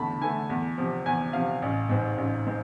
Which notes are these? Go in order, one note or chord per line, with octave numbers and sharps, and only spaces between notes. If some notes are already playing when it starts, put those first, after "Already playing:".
Already playing: E2 D3 A3 A5 B5
D3 A3 G#5
E2
C3 F3
E2 G#5
C3 F3 F5
A1
G#2 G#3 C4
A1
G#3 C4